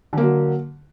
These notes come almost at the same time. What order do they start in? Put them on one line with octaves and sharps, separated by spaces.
D3 A#3 F#3